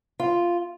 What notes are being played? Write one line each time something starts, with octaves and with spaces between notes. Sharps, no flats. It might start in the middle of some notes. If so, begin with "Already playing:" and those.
F4